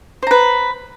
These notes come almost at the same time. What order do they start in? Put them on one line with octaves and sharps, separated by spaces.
C5 A#5 B4